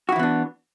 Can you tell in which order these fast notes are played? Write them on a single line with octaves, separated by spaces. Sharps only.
F#4 E4 E3 B3 D4